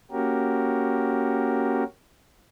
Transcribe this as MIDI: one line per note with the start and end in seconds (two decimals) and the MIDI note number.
0.11 1.84 58
0.11 1.84 61
0.11 1.84 66
0.11 1.84 67
0.11 1.84 70